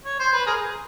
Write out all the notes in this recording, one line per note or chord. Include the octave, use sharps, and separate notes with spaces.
C#5
C5
B4
G#4 A#4